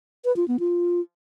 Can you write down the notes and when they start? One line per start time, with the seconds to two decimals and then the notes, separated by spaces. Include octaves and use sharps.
0.25 B4
0.36 F4
0.48 B3
0.60 F4